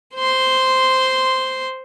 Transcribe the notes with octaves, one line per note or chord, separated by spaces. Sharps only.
C5 C6